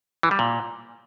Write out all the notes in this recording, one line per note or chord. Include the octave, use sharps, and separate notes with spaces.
E3
G3
A#2